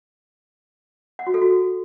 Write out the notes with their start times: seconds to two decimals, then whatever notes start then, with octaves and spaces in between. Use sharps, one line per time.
1.19 F#5
1.27 F#4
1.34 A4
1.42 F#4